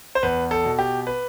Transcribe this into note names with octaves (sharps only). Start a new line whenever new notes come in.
C5
E2 B4
A4
B2
G4
B4